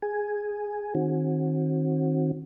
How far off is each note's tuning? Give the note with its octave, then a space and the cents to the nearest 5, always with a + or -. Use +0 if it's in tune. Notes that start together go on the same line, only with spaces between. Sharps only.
G#4 +0 G#5 +0
D#3 +0 C4 +40 F#4 -10